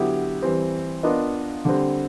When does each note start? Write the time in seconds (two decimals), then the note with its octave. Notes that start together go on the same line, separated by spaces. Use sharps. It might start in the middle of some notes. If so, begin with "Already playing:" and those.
Already playing: D3 F#3 B3 E4 G4
0.42 E3 G3 C4
1.03 B3 D4 F4 A#4 D#5
1.65 D3 G3 C4